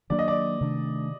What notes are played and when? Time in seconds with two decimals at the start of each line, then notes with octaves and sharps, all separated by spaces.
0.10 D#3 F#3 A#3 D4 D5
0.19 D#5
0.28 D5
0.61 C3 D#3 A3 D4